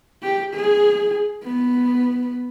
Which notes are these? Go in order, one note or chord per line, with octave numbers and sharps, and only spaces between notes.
G4
G#4
B3